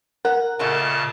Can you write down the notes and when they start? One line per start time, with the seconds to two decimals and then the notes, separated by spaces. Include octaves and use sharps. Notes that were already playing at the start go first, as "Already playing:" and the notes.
0.25 A#4 F#5
0.59 A#2 C#3 G#3 A3 F#4 A5